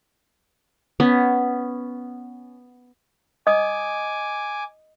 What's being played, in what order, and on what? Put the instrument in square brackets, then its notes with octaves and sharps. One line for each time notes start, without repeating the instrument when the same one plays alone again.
[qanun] B3 C#4
[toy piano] D#5 D#6 [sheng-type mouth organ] G#5 D6